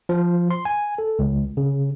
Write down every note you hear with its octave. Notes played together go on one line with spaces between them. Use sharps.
F3
C6
G#5
A4
C#2
C#3